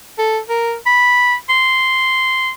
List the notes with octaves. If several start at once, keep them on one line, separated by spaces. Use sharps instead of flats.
A4
A#4
B5
C6